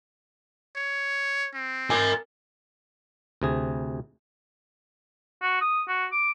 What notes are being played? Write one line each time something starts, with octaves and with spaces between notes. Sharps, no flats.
C#5
C4
A#4 G#5
D2 C3 G#4
F#4
D#6
F#4
D6